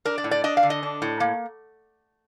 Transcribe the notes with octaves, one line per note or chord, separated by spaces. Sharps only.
D4 A#4
D5
A2
D5
D4 D#5
F5
D3
D#5
D4
A2
A#3